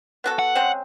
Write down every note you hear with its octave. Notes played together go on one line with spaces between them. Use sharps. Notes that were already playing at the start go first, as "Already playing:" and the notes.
B3 F#4 A4
F#5
C#3 G#3 C4